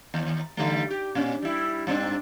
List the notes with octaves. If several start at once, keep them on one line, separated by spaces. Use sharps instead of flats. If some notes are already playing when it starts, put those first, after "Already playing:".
D#2
D3 G3 A3
G4
A#2 C#4 D4
G3 E4
G2 C4 D4